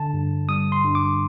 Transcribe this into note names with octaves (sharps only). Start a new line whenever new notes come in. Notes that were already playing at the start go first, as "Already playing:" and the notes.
Already playing: D3 A5
G2
G3 D#6
C6
G2
D6